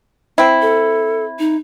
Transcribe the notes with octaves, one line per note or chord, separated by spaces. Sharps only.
C4 E4
A4
D#4